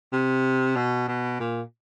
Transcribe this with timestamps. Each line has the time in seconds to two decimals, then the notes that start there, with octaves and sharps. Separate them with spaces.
0.13 C3
0.76 B2
1.08 B2
1.40 A#2